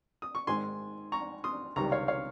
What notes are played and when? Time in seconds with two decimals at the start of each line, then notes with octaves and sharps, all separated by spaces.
0.22 D#6
0.35 C#6
0.47 G#2 D#3 G#3 G#5 C6
1.12 A#5 C#6
1.44 C6 D#6
1.76 C#2 C3 D#3 G3 A#5 C#6
1.92 C#5 F5
2.08 C#5 F5